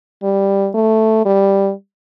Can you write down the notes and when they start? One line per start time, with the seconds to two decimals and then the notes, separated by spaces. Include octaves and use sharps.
0.23 G3
0.75 A3
1.25 G3